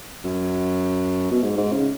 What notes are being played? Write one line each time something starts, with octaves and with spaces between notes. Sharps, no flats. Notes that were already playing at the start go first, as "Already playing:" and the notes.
F#2
B2
G#2
G#2
C#3